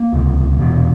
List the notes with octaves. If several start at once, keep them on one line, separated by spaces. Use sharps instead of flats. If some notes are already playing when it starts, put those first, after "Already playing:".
Already playing: A#3
C#2 C3
F1 E2 B2